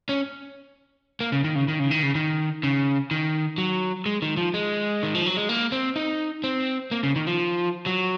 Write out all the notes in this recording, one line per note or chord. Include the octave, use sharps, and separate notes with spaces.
C#4
A#3
C#3
D#3
C#3
D#3
C#3
D#3
C#3
D#3
C#3
D#3
F#3
G#3
D#3
F3
G#3
D#3
F3
F#3
G#3
A#3
C4
D#4
C4
A#3
C#3
D#3
F3
F#3